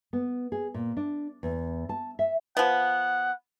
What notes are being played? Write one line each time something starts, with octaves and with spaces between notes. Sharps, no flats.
B3
G#4
A#2
D4
E2
A5
E5
F3 B3 F#5